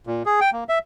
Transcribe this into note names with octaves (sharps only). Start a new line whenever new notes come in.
A#2
G#4
G5
A#3
E5